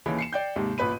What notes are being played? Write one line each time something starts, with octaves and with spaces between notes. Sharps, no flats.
D#2 C#3 E3
C7 C#7 E7
D5 G5 G6
D#2 G#2 C3
A1 A#2 B4 B5 D#7